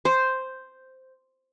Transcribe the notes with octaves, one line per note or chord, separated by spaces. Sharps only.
C5